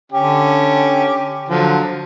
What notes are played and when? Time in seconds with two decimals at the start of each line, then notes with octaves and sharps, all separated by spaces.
0.12 D3 C#4 G4
1.49 D3 F3 F#3